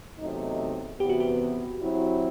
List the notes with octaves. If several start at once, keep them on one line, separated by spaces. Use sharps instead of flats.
E2 C3 F#3 A3 D#4
E2 C3 E3 B3 G4
F#4
G4
F#3 C4 E4